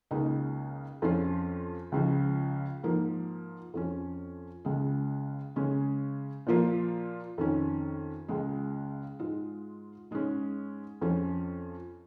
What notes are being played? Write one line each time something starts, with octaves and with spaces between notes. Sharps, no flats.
C#2 C#3 A#3 D#4
F2 F3 C#4 F4
C#2 C#3 F3
G#2 F3 A#3
F2 F3 C#4
C#2 C#3 G#3
C#3 G#3 C#4
A#2 F3 A#3 F4
F2 D#3 C#4
C#2 C#3 G#3
G#2 G#3 F4
G#2 G#3 C#4
F2 F3 C#4